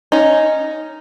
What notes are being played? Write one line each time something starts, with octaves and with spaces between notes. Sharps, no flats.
C#4 D#4